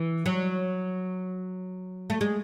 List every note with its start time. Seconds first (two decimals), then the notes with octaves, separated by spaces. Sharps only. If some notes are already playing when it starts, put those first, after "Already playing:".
Already playing: E3
0.26 F#3
2.10 A3
2.21 G#3